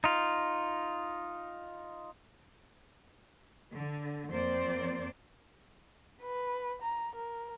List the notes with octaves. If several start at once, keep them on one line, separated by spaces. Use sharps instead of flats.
D#4 F4
D3
F2 A#3 C4 C5 D5
B4
A#5
A#4